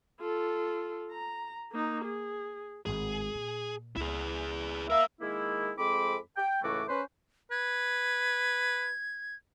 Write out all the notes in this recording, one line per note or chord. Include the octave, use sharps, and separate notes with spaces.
F4 A4
A#5
A#3 D#4
G#4
G#1 A2 G#4
A#2
C#2 E4 G#4
A#4 E5 F5
D#3 G#3 A#3 E4
F2 G#3 C4 B5 D6
G5
C#2 A2 E3 A3 F#4 D6
C#4 B4 C5
B4 G#6